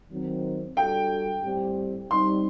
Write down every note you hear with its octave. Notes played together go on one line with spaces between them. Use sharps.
D#3 F#3 C4
G3 D4 F#4 A4 G5
A2 G3 C4 G4
G3 C4 D#4 C6